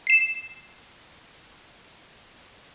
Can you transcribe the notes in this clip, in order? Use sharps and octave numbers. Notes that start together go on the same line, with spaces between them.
C7 E7